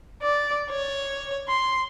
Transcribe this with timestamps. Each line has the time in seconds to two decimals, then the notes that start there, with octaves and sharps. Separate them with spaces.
0.22 D5
0.70 C#5
1.48 C6